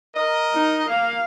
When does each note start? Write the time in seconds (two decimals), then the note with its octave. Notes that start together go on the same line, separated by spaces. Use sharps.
0.15 A#4 D#5
0.54 D#4
0.89 A#3 F5